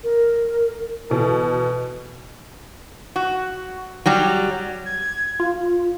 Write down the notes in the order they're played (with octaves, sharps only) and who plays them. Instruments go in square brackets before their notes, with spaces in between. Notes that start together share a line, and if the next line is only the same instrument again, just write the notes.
[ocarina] A#4
[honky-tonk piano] B2 E3 A4
[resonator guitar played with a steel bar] F#4
F#3 G3 G4
[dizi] G#6
[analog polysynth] F4